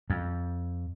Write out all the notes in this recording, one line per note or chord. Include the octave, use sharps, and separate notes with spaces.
F2